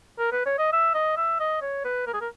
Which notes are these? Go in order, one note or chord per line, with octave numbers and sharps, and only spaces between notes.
A#4
B4
C#5
D#5
E5
D#5
E5
D#5
C#5
B4
A#4
G#4
A#4